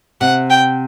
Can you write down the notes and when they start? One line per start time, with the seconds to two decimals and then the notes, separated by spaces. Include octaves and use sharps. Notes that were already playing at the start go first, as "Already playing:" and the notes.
0.21 C3 F#5
0.50 G5